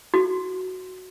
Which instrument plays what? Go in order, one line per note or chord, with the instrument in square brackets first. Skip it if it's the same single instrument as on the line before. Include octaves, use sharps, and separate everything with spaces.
[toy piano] F#4